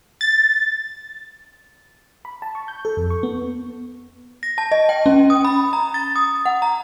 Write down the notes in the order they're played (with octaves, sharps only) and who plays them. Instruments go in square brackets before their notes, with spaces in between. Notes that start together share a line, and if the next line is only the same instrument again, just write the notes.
[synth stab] A6
[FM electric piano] B5
A5
C#6
G6
A4
F2
C#6
B3
[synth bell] A#6
A5
D#5
G5
C#4
D#6
B5
A#5
A6
D#6
F#5
A#5